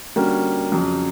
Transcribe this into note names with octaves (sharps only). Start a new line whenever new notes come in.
D3 G3 A#3 C#4 F#4
F2 C#3 F#3